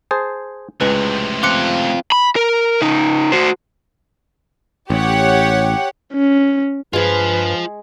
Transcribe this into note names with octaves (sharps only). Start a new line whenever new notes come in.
G#4 C5 A5
C#2 A2 C3 G#3 B4
C4 F4 D6 F#6 C#7
B5
A#4
C#3 D#4
F#4 C5
A1 G4 C#5 F#5
C#4
G2 G#3 F4 G#4 B4 C5